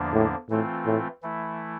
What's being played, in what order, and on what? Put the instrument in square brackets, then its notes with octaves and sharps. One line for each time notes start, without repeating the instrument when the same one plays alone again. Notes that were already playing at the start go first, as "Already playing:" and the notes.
Already playing: [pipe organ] E2 D3 F3 A#3 D4
[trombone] A2
[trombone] A2 [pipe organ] E3 A3 C4 F4
[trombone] A2
[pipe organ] E3 A3 E4